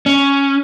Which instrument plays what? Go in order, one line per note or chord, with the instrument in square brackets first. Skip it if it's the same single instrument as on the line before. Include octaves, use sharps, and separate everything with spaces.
[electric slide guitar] C#4